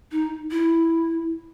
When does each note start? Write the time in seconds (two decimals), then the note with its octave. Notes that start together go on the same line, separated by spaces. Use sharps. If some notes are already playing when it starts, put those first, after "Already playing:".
0.12 D#4
0.51 E4